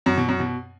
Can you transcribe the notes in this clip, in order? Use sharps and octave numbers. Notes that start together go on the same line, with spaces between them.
F#2
B2
F#2
B2